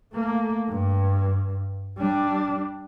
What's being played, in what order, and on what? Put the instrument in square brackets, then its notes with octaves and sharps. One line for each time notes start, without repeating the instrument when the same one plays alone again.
[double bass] A3 A#3
G2
G3 D4